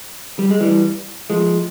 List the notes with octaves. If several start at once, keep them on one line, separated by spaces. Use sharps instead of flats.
G3
G#3
E3 G3
F3 G#3